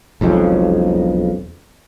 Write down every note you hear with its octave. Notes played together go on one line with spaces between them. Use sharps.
E1 B1 F2 C#3